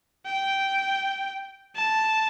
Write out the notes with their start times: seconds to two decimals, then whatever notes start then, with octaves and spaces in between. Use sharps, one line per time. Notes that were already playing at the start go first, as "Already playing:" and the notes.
0.26 G5
1.75 A5